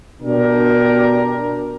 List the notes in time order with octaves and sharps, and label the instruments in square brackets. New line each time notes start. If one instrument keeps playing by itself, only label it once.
[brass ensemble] B2 D4 G4 A#4